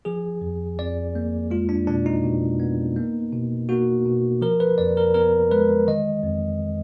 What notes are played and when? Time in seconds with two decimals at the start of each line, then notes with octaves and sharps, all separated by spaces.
0.05 F3 G#4
0.42 F2
0.78 F2 D5
1.15 A#3
1.51 G#3 F4
1.69 D4
1.87 B2 D4
2.06 D#4
2.24 B2
2.60 B3
2.96 A#3
3.32 B2
3.69 A#3 F#4
4.06 B2
4.41 F3 A#4
4.60 B4
4.78 F2 D5
4.97 A#4
5.14 B3 A#4
5.51 G#3 B4
5.87 D#3 D#5
6.23 F2